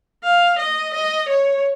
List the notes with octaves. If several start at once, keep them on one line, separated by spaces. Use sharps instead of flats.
F5
D#5
D#5
C#5